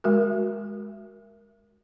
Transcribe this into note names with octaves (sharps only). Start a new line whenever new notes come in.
G#3 F#4 A#4